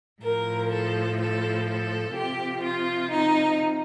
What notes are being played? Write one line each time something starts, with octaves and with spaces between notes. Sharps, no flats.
A2 F3 A#4
A4
A4
A4
C3 F3 G4
F4
D#4